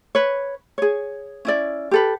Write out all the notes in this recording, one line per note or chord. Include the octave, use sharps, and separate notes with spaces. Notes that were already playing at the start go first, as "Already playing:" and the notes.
B4 C#5
G#4 C#5
C#4 E4 D5
G4 A4 B4